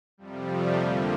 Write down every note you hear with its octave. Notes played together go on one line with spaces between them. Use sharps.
F2 C3 F3 G3
A3
F2 D3 F3 A#3